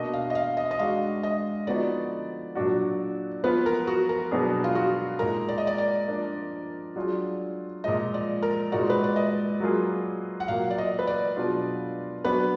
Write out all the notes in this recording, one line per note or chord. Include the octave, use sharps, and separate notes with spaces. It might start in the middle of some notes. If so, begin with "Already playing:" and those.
Already playing: B2 A#3 D4 F#4 D#5
F5
D#5
F5
D#5
D#5
G#3 D4 F#4 F5
D#5
D3 F3 B3 D#4 F#4 D5
A#2 F#3 D4 F#4
F3 B3 F4 B4
A#4
F#4
A#4
B2 F#3 B3 D4 G#4
F4
F#4
A#2 G#3 D#4 G#4 A#4
D5
D#5
D5
D5
F3 A#3 D4 F4
F#3 D4 F4 G#4
A#2 F3 G#3 D#5
D5
A#4
A#2 G#3 D#4 F#4 D5
B4
D5
D#5
F#3 A#3 F4 G#4
F#5
A#2 F#3 A#3 F5
D5
D#5
B4
D5
B2 F#3 D4 F4 G#4
F#3 B3 D4 F#4 B4